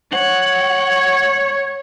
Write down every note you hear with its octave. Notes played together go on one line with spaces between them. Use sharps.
C#5 F#5